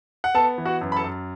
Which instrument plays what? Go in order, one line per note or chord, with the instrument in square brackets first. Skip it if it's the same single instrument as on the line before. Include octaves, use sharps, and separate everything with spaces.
[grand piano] F#5
B3 A4 A5
E3
F#4 F#5
F#2
B5
A4 A5
F#2